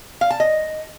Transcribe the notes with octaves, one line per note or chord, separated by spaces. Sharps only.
F5
A5
D#5